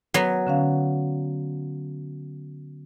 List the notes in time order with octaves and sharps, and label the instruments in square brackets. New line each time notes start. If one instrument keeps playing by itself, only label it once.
[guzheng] F#3 B3
[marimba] D3 C#4 F5